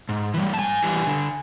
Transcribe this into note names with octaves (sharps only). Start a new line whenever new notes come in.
G#2
E3 G3
A5
G#2 G#5
E3 G3
D3